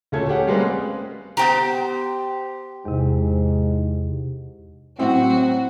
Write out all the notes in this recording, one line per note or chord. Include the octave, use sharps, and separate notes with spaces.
D2 A#2 A3 C#4 A4 G#6
C#4 G4 G#4 F#5
G3 G#3 A#3 C4 B4
G#4
B3 G4 C5 G5 A#5
E2 G#2 C3
A2 F#3 C4 F#4